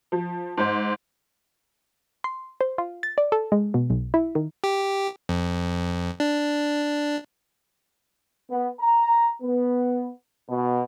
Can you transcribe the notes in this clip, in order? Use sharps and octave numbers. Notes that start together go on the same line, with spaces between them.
F3
G#2 C5
C6
C5
F4
A6
D5
A4
G#3
B2
B1
E4
D#3
G4
F2
D4
B3
A#5
B3
B2